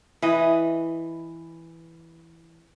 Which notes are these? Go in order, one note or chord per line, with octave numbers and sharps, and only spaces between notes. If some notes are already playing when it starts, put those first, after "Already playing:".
E3 B4 D#5